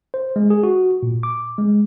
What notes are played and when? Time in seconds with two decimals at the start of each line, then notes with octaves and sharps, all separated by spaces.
0.14 C5
0.36 G#3
0.50 G#4
0.63 F#4
1.03 A#2
1.23 D6
1.58 G#3